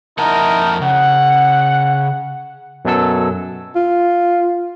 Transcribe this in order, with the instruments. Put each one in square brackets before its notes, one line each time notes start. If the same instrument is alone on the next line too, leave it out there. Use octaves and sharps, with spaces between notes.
[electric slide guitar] F2 F#5 A5 [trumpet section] D#4 E4 A#4
[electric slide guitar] C#3 [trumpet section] F#5
[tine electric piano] F#2 B2 F#3 A4 E6
[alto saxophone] F4